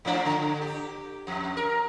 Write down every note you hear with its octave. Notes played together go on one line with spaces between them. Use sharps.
G#2 F3 D4
D3
G4
F2
A#4